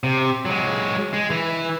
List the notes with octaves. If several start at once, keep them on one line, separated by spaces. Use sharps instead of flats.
C3
F#3 G#3
G#3
E3